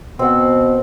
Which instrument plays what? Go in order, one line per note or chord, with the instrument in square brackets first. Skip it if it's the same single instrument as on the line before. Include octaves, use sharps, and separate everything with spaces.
[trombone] B2 [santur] C4 F#5